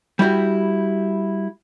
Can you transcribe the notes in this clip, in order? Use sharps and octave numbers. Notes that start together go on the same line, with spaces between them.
G3 E4 F#4 G4